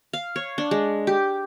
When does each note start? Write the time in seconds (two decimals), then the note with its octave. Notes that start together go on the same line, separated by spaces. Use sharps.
0.13 F5
0.36 C#5
0.58 D4
0.71 G#3
1.07 G4